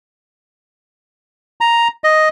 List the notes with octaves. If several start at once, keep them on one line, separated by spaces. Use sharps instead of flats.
A#5
D#5